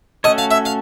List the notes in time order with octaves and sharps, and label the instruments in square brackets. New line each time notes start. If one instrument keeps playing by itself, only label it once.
[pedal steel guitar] A3 C#4 F#4 A4 C#5 [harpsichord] D#5
[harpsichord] F5
E5
F5